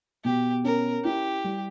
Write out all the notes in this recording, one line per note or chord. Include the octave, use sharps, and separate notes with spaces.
B2 G4
C#4 A#4
E4 G4
G3